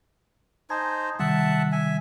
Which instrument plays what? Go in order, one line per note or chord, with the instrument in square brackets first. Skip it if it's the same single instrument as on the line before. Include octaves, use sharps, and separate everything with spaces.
[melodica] D#4 C5 [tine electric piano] G#5 A5 G#6
[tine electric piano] C3 D#3 G3 [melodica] E5 F#5 A5
[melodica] E5 G#5